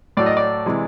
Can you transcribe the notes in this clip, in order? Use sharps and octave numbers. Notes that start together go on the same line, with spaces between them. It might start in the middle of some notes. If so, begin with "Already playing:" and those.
A2 F#3 A3 D5
D#5
D5
C3 E3 G#3